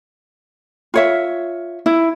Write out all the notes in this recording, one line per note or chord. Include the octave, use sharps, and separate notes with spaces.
F4 C#5 E5
E4